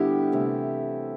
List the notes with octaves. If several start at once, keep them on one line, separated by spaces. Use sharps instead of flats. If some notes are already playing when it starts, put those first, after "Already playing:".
Already playing: D3 G3 B3 E4 G4
C3 E3 A3